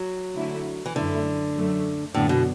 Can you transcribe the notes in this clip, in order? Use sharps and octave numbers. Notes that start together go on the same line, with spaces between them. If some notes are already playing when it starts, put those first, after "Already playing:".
Already playing: F#3
D3 A3 E4
E3
F#2 D3 F#3 A3 E4
F#2 F#3 A3
F#2 A2 D3 B3 D4
B2